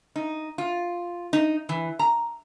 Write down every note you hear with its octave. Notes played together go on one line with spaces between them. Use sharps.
D#4
F4
D#4
E3
A#5